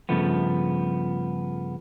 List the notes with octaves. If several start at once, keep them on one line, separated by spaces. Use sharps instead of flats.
G2 C#3 F3 A3 B3